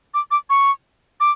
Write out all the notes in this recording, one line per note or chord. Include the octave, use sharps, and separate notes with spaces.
D6
D6
C#6
D6